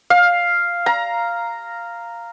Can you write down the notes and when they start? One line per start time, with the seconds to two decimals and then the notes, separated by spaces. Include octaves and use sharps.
0.10 F5
0.86 A#5